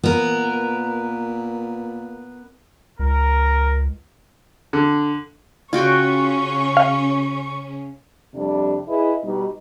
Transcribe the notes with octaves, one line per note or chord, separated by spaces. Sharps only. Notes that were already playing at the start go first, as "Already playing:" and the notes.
A#2 B3 A#4
C#2 A#4
D3
C#3 C#4 F4 F#4 G5 C#6
F5
F2 C3 G3 D4
E4 G#4 B4 D#5
B2 G3 D#4